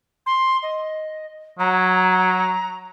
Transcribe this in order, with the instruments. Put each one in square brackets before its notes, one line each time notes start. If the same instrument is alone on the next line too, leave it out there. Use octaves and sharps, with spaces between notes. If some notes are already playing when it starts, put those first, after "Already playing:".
[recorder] C6
D#5
[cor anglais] F#3 [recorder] A#5